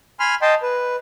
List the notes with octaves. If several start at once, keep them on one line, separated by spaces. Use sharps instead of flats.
G#5 B5 C6 F6
D#5 G5 A5 C6
B4